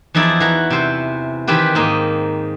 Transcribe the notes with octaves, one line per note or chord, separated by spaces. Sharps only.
E2 F3 D#4 E4 D5
E3 F#4 A#5
C3 C5
D#3 E3 C4 G4 B4
G#2 A#3 D#5